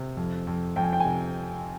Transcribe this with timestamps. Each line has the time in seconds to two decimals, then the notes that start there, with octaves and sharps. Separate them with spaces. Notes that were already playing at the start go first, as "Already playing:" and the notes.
Already playing: C3
0.17 F2
0.47 F2
0.76 F2 G5
0.83 G#5
0.93 G5
1.00 G#5
1.05 C3